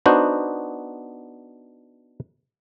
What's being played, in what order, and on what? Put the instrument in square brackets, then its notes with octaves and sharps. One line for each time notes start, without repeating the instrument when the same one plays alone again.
[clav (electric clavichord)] B3 D4 D#4 F#4 C5